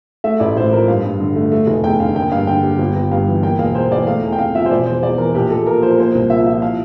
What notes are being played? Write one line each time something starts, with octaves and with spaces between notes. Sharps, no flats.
A3 E5
A1 D5
A2 C5
F3 A#4
G2 F5
G2
D3
A3
A3
F1
E2 G5
D3 F5
A#3 G5
G2 F5
D3 G5
G3
G1
G1
G2 F5
E3
A#3 G5
E1 F5
E2 C5
E3 D5
A3 F5
E2
G5
C3 F5
F3 E5
C5
E1 D5
E1 C5
E2 D5
E3 A#4
A#1 G4
A#1 A4
A#2 A#4
F3 C5
A#4
A#3 C5
C2
A#2 E5
F3 E5
E4 F5